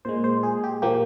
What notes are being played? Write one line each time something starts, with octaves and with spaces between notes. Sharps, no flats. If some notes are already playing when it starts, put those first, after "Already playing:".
A#2 G#3 C5
C5
G#4
G4
F3 A#3 G4